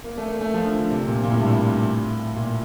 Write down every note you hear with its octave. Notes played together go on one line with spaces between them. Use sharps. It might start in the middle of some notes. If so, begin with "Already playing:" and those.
A#3
A3
A#3
A3
F3
D3
D3
C3
A#2
A#2
A2
G2
A2
A#2